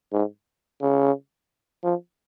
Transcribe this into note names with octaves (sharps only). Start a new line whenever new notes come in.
G#2
C#3
F3